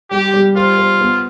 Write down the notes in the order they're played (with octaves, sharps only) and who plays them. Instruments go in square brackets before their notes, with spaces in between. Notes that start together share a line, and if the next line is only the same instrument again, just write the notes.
[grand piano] G3 [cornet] G4
[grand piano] G3
[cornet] F4 [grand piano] C5
[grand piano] C5
B3